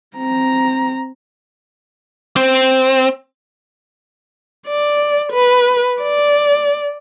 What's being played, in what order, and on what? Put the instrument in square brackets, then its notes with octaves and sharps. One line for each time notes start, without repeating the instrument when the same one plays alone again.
[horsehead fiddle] C4 A#5
[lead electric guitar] C4
[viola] D5
B4
D5